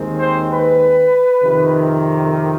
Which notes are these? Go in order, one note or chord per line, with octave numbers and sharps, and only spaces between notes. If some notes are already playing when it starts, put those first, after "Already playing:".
Already playing: D#2 D#3 G#3 C4
C5
B4
F2 C3 D#3